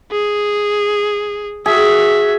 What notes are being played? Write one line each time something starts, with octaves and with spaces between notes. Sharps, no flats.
G#4
F#4 G#4 E5